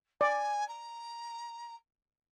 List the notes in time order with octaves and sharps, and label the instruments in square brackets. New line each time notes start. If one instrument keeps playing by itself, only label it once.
[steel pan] D5 [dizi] G#5
[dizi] A#5